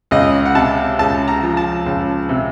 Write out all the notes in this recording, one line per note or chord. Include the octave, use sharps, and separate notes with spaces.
C#2 D#5
F#5
C3 A5
C#2 A5
A#5
F3
A5
C#2
C3